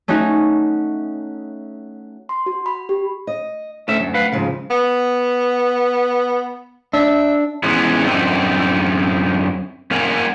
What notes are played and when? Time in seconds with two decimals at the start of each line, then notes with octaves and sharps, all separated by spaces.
0.08 A3 C#4 D#4 F#4
2.29 C6
2.46 F#4
2.66 B5
2.89 G4
3.27 D#5
3.88 D2 A3 C#4 E5
4.01 F#2
4.14 B4 F5 F#5
4.32 F2 G#2 C#3 F3
4.70 B3
6.94 D4 E5
7.63 E3 G#3 B3 C#4
8.04 F#2 D3 C4 D#4
9.91 A#3 A#4 C#5 F5 F#5 G#5